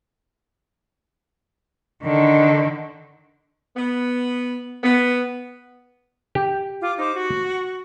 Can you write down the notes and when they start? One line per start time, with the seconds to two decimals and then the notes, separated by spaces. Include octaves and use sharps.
2.03 D3 D#3
3.77 B3
4.84 B3
6.35 G4
6.82 F4 D6
6.98 D#4 C5 D6
7.15 F#4